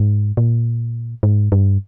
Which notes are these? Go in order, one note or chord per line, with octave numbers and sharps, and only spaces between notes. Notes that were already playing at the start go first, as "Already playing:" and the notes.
Already playing: G#2
A#2
G#2
G2